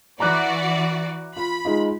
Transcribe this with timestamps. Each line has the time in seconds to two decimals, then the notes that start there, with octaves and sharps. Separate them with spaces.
0.20 E3 F#4 D5 A#5 D6 F#6
1.37 F4 B5
1.65 G#3 D#4 F4